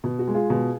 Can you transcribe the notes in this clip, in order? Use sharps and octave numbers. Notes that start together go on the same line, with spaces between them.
B2
F#4
G#3
F4 G#4
B2